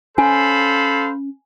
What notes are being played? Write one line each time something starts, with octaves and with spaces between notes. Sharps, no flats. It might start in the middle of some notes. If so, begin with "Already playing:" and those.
C#4 A4 C5 F5 G#5 B5